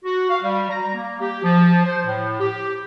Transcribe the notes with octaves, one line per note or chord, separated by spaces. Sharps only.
F#4
F5
G3
A#5
A#3
G4
F3
C5
A2
G4